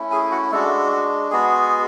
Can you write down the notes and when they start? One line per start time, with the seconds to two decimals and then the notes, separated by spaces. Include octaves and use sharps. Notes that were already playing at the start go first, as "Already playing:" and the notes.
Already playing: A3 C#4 E4
0.11 G#4 G#5
0.31 F#4 F#5
0.51 G#3 A3 D4 F#4 A4
0.92 F#4
1.31 G#3 B3 F#4 G#4